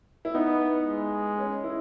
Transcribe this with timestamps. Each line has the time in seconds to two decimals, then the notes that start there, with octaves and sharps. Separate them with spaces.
0.25 E4
0.34 B3 D#4
0.86 G#3
1.38 C#4
1.64 E4